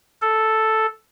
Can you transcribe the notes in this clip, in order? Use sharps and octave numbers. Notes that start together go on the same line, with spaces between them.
A4